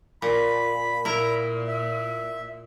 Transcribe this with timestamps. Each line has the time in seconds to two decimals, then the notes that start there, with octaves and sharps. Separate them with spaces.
0.22 A#2 B5
1.05 A#2 E4 A#4 A#5
1.68 E5